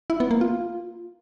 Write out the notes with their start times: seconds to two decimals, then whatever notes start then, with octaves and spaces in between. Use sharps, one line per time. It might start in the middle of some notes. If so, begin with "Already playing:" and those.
0.10 E4
0.20 B3
0.31 A#3
0.41 F4